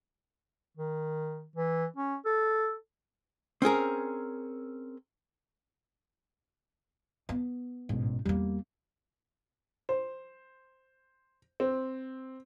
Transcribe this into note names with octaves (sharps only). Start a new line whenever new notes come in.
D#3
E3
C#4
A4
C4 C#4 G#4 A#4
B3
A1 G#2 B2
E2 G3 A#3
C5
C4